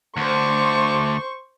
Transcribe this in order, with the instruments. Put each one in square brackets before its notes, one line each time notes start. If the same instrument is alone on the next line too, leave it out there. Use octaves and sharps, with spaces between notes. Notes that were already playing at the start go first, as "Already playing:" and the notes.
[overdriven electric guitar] D2 [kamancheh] C5 C#6 [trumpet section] A5 D6